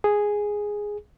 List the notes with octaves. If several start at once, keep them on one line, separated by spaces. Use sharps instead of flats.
G#4